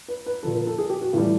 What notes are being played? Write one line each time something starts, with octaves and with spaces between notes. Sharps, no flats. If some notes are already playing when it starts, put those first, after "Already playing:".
B4
B4
A#2 F3 A4
A#4
A4
G#4
G4
F#4
A2 E3 G3 F4